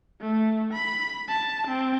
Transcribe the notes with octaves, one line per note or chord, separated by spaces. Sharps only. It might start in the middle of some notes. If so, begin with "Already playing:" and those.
A3
B5
A5
C4